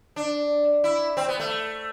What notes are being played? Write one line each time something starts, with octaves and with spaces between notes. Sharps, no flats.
D4
E4
C4
B3
A3